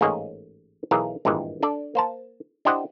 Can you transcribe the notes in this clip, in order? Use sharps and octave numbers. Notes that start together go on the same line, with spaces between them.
A1 G#2 A#3 G#4 C#5 D#5
B1 E3 G#4 A#4 F5
G#1 G2 A#2 E3 G#3
D4 A4 D5
A#3 C5 A5
D4 E4 G4 C5 D#5 F#5